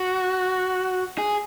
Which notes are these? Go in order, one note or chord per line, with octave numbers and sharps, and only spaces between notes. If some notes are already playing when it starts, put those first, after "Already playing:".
Already playing: F#4
G#4